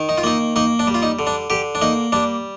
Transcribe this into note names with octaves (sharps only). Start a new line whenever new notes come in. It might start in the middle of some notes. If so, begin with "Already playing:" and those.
Already playing: D#3
D#4
F4
A#3 D#4
A#3 D#4
D4
G3
F4
D#4
D3
D4
D3 G4
D4
A#3 D#4
G3 D4